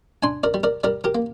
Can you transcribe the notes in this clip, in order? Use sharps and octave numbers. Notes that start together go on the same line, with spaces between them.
D4 G#5 C6
A#4 D5
G3
A#4 D5
G3 A#4 D5
G4 A#4
A#3